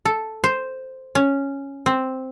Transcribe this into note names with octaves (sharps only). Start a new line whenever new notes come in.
A4
C5
C#4
C4